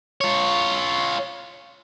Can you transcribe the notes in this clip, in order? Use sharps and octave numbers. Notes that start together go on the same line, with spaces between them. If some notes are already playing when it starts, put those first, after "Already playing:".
F4 C#5